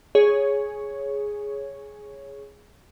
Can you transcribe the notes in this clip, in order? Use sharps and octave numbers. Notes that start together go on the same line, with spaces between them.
G#4 C#5